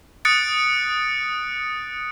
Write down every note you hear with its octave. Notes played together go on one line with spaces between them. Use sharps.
D#6 F#6 A6 C#7 D7